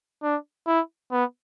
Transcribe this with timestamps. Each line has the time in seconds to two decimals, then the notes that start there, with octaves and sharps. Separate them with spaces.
0.23 D4
0.67 E4
1.11 B3